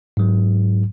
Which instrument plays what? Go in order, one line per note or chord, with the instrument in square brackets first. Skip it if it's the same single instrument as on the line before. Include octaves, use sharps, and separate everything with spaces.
[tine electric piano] G#2 F#3